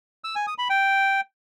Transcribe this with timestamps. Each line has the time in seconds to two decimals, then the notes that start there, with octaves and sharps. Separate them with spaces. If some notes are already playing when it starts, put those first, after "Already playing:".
0.24 E6
0.36 G#5
0.47 D#6
0.58 B5
0.70 G5